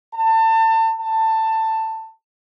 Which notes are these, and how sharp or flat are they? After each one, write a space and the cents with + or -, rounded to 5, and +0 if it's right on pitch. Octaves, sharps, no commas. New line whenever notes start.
A5 +30
A5 +15